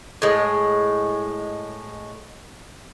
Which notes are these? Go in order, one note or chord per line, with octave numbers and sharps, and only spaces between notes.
A2 G#3